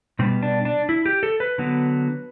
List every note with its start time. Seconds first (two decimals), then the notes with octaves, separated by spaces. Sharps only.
0.19 B2 G3 B3 C4
0.43 D4
0.65 D4
0.89 E4
1.06 G4
1.23 A4
1.40 B4
1.58 D3 F#3 B3